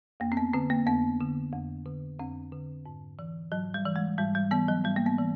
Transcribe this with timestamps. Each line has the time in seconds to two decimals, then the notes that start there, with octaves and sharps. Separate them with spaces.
0.20 F2 A#3
0.32 C4
0.37 B3
0.54 D3 C4
0.70 A#3
0.87 F2 B3
1.20 D3
1.53 F2
1.86 D3
2.19 F2 C4
2.52 D3
2.86 G#2
3.19 E3
3.52 G#2 F#3
3.74 G3
3.86 E3
3.96 G#3
4.18 G#2 G3
4.35 G3
4.51 E3 B3
4.68 F#3
4.84 G#2 G3
4.96 A#3
5.06 B3
5.18 E3